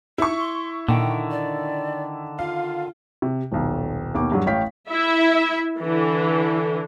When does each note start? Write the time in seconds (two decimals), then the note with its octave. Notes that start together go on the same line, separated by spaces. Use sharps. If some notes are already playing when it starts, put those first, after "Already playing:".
0.18 D#4 E4 C#6
0.39 C6
0.89 A#2 D3 D#3 G5
1.31 D5
2.39 F4 F5
3.22 C3
3.52 D#1 B1
4.15 D#2 B2 D6
4.32 G2 F#3 G3
4.46 A1 C#5 F5 G5 B6
4.90 E4 E5
5.80 D3 E3